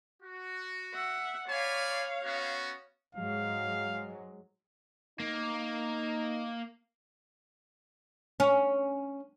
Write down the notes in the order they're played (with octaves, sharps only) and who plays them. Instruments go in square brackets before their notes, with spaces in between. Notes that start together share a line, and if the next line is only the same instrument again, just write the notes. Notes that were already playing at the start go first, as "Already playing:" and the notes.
[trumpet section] F#4
[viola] E5 F#5
[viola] C#5 F5 [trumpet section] D5 G#5 B5
[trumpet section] B3 C#4 F#4
[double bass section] G#2 F#3 G#3 [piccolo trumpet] F5
[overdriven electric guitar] A#3 [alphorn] D#4
[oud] C#4